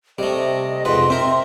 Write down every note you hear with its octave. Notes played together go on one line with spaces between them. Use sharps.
C3 G3 A3 D#5
F2 G#2 B4 C6
C4 A#4 E5